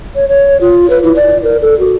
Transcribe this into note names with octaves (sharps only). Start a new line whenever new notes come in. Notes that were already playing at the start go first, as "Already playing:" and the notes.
C#5
C#5
F4
B4
E4
D5
A#4
A4
F#4